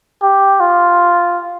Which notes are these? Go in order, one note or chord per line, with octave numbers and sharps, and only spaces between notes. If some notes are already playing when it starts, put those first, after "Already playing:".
G4
F4